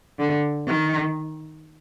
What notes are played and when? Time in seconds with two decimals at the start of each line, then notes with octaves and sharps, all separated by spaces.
0.19 D3
0.67 D#3